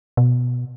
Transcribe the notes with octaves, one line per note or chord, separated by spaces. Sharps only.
B2